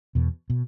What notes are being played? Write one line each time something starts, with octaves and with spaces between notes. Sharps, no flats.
E2 B2
B2